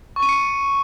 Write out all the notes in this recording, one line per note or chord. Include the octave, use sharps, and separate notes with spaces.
C#6
D#7
C#7